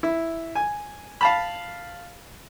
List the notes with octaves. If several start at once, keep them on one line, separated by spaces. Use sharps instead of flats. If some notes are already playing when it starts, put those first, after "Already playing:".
E4
G#5
F5 A5 B5